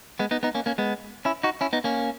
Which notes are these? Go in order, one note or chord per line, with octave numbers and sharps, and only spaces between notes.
G#3 B3
B3 D#4
B3 D#4
A#3 C#4
A#3 C#4
G#3 B3
C#4 E4
D#4 F#4
C#4 E4
B3 D#4
A#3 C#4